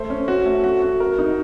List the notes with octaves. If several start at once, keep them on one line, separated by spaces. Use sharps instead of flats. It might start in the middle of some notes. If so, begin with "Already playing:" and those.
Already playing: A3 C5
C#4
F#4
A3
F#4
F#4
A#4
D#4